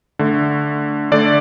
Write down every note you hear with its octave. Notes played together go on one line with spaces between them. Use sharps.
D3 A3
D3 A3 D5